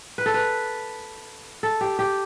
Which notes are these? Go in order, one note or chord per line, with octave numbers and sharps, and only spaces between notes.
B4
A4
B4
A4
G4
G4